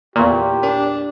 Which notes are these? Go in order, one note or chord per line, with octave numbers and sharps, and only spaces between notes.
E2 A#2 G4 A#5 C6 C#6
D4 A#4